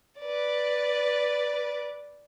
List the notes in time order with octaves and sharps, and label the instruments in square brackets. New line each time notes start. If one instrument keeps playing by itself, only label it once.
[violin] B4 D5